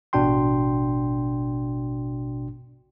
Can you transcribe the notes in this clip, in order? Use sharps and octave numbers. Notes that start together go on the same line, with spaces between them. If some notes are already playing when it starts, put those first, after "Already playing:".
A1 B2 D4 F#4 G5 C6